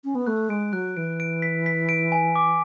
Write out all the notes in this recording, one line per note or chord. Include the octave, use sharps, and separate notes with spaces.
C#4
B3
A3 F#6
G#3 D7
F#3 F#6
E3 D7
D7
B6
B6
D7
G#5
D6